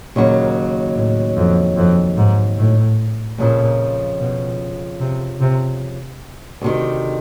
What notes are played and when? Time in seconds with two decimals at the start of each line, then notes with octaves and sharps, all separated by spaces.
0.16 D#2 A#2 C#3 F#3
0.96 A2
1.37 F2
1.77 F2
2.17 G#2
2.58 A2
3.38 F2 A#2 C#3 F3
4.19 B2
5.00 C3
5.40 C3
6.61 D2 C3 D#3